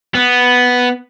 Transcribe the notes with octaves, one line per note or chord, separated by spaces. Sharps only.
B3